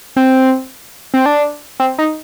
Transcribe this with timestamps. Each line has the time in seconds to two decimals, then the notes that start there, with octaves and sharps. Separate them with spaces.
0.16 C4
1.14 C4
1.26 D4
1.80 C4
1.98 D#4